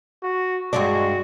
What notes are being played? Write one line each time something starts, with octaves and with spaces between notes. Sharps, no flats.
F#4
G2 G#3 D4 F#4